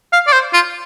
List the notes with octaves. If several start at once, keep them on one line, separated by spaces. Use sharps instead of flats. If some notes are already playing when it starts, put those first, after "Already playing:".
F5
D5
C5
F4